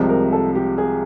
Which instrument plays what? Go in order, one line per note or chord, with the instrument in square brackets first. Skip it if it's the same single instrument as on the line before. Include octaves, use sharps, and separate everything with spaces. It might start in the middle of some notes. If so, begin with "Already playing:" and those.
Already playing: [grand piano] C2 C3 F3 G#3
[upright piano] A#4
A4
G4
G#4